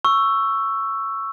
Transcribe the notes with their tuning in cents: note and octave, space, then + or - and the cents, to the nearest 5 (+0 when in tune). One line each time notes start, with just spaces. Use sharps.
C#6 +0 E6 +10